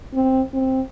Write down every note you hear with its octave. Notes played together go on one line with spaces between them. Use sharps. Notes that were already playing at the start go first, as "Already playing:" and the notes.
C4
C4